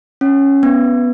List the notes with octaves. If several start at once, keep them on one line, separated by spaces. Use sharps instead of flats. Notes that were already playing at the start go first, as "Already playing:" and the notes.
C#4
B3